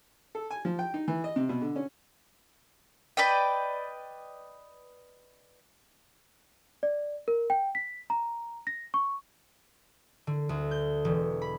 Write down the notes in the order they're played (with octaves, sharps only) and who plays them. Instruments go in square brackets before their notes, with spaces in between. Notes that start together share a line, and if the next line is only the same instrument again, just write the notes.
[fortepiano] A4
G#5
F3
G5
D#4
E3
D#5
C3
B2
D3
C#4
[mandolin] B4 D5 D#5 G5
[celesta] D5
A#4
G5
B6
A#5
A#6
C#6
[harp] D3
D2
G6
E1
B5